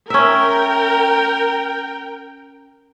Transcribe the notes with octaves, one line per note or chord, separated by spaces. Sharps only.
C#4 A#4 E5 G5